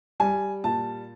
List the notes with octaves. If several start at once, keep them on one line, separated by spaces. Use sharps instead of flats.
G3 G#5
A#2 A5